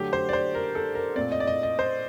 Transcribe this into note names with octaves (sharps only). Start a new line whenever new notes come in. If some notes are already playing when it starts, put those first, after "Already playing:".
Already playing: D3 F#3 A3 G4
C5
D5
C5
A#4
A4
A#4
A#2 A3 C4 D5
D#5
D5
D#5
D#5
C5